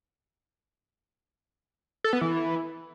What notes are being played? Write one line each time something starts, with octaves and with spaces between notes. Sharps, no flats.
A4
B3
E3